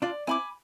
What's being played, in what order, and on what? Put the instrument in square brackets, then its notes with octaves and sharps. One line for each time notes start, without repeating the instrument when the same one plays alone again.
[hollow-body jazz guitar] D4 F4 [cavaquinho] D5
[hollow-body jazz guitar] C4 E4 [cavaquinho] G#5 B5 D6